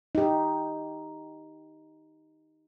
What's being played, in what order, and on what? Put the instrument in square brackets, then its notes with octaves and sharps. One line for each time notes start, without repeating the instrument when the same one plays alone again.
[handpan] D#4 G4